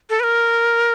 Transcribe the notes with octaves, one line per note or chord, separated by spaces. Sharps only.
A4
B4
A#4